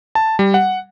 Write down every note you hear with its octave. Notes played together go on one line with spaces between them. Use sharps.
A5
G3
F#5